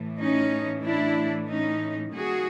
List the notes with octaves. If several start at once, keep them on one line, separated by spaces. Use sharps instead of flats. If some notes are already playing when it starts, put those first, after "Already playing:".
Already playing: A2 E3 A3
C#4 D#4
D4 E4
C#4 D#4
D#3 G3 A#3 F#4 G#4